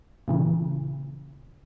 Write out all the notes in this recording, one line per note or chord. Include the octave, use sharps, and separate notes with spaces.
A#2 C#3 E3